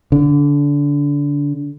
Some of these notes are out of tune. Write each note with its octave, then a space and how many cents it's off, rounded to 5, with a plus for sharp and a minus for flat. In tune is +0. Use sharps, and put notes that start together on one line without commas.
D3 -25